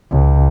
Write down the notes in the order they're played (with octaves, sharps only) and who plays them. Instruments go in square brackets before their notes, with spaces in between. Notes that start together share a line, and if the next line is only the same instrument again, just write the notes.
[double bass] C#2